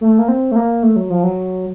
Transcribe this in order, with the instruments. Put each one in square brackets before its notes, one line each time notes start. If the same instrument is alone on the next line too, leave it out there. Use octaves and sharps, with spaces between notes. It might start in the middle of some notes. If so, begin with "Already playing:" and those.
[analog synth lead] A3
A#3
C4
A3
A#3
A3
F#3
F3
F#3